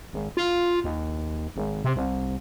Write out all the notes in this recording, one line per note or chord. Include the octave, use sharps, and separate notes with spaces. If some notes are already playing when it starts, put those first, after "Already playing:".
G#1
F4
D#2
G#1
C3
C2